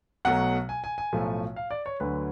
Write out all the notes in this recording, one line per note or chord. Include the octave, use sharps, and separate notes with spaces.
B1 B2 F#3 A3 F#5
G#5
G#5
G#5
B1 A2 F3 A3
F5
D5
C#5
D2 D3 F#3 B4